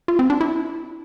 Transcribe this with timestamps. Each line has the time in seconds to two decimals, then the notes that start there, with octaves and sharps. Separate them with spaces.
0.08 F4
0.19 C4
0.30 D4
0.41 E4